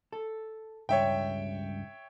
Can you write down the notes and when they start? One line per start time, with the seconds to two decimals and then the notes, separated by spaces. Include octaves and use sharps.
0.12 A4
0.89 C#2 G2 C#5 E5 G5